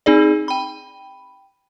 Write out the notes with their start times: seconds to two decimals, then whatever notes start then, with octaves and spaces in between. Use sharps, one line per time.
0.06 C4 D#4 G#4 D5
0.48 G5 B5